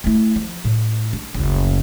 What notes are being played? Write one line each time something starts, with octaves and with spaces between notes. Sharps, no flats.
A3 E4
F3
A2
D4
F#1 D2